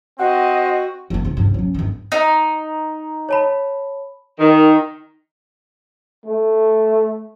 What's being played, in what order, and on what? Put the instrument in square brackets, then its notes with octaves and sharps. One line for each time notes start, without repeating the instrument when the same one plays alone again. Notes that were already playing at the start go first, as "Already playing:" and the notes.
[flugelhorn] C4 [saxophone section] F#4 [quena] D#5 [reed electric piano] F#5
[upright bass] F1 A#3
C2 D#3
G2 C3
F#3 C#4
G1 D#3
[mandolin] D#4
[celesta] C#5 A5 B5
[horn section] D#3
[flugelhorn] A3